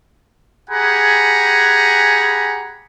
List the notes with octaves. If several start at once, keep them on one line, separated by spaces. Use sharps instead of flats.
G4 G#4 F#5 G#5 A#5 B5